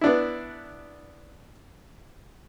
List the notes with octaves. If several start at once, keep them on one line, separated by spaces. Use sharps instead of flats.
B3 D4 E4